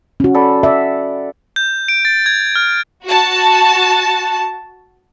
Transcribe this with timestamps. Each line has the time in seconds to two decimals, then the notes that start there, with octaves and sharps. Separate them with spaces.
0.20 C#4 F#4
0.34 A4 D5 B5
0.63 D5 E5 F#5
1.56 G6
1.88 D7
2.05 A6
2.26 G#6
2.56 F6
3.05 F#4 A5